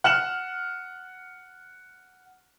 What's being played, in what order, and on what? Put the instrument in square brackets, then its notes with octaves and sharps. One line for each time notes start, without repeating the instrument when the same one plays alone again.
[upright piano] F#5 F6 E7 F#7